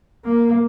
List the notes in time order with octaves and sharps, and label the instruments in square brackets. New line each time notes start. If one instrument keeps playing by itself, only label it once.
[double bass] A#3